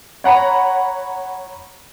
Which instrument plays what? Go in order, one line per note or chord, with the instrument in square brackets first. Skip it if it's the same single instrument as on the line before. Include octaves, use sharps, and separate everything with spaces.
[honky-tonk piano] C#5 F#5 A#5 B5